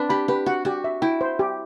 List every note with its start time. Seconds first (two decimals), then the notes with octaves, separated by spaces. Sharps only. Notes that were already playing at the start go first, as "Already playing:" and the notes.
Already playing: C4 D4 B4
0.10 G4 B5
0.28 G4 B4
0.46 F#4 F#5
0.65 F#4 G4
0.84 E5
1.02 E4 G5
1.21 C5
1.39 G4